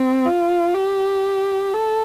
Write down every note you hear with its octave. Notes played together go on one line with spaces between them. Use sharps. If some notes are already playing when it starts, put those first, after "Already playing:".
Already playing: C4
F4
G4
A4